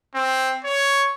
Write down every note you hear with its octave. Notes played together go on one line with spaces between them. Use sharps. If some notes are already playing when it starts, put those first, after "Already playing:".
C4
C#5